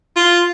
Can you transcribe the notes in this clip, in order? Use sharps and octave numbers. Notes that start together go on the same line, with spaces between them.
F4